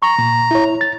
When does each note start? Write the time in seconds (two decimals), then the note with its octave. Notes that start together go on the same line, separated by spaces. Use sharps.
0.02 A#5 C#6
0.19 A#2
0.51 E4 C#5
0.81 A6